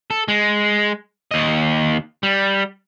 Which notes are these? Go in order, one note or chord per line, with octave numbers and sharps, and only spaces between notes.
A4
G#3
D#2 D#5
G3